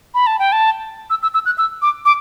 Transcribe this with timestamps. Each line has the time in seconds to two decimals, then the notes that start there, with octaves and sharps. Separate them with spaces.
0.14 B5
0.27 A5
0.39 G5
0.52 A5
1.10 E6
1.22 E6
1.34 E6
1.46 F#6
1.58 E6
1.82 D6
2.05 D6